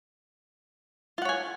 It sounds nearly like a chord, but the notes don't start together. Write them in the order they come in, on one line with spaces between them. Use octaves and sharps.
F4 F#5 C#5 G#5